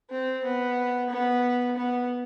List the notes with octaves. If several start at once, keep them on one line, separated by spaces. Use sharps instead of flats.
C4
B3
B3
B3